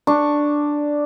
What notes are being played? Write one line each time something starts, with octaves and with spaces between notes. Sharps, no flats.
D4 C#6